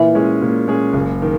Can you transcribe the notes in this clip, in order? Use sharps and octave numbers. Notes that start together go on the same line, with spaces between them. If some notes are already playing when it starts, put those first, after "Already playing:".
Already playing: A#2 E3
G#3 C#4 G#4
A#2
G#3 C#4 G#4
F#1
D#3